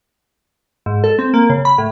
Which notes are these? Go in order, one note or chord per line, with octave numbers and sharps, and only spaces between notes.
G#2
A4
C4
A#3
C#3
B5
A2